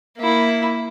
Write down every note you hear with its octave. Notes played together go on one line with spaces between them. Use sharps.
A#3 E4